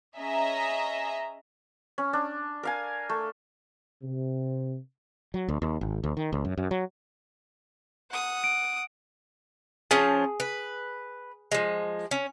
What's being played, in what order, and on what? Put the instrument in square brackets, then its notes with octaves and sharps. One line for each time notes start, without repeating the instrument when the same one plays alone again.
[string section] C#4 G#4 D#5 E5 A#5
[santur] C#4
D4
A#4 F5 G#5
A3
[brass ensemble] C3
[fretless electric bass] F#3
D2
D#2
G#1
D2
D#3
C#2
F#2
F#2
F#3
[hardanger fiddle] F#5 D#6
[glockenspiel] D7
[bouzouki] F3 C#4 A5 [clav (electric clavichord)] G#4
[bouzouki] B4
F3 G#3
C#4